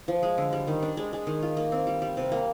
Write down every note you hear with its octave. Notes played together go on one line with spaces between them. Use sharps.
F3
G#3
D3
G3
D#3
D4
G#3
G#3
D#3
F4
A#3
C4
G3
G3
C3
A#3